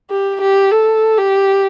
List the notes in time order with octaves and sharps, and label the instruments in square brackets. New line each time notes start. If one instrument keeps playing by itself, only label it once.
[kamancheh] G4
G4
A4
G4